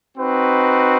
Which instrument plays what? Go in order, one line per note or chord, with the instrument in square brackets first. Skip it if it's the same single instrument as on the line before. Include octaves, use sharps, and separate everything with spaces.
[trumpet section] C4 D#4 F#4 B4